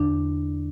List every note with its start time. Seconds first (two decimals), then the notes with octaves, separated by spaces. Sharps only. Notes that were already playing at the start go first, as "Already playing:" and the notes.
Already playing: E2 D3 D4